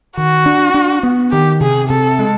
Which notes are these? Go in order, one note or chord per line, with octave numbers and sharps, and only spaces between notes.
D#3 F#4
D4
D4
B3
D#3 G4
C3 G#4
C3 A4
G#3